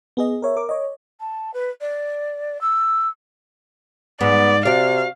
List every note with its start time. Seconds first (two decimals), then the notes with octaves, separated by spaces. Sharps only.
0.17 B3 G#4 D#5
0.42 A#4 C#5 E5
0.56 A#4 D6
0.69 C#5 D#5
1.20 A5
1.54 B4
1.81 D5
2.61 E6
4.21 G#2 B3 D5
4.65 C3 F#4 D5 F5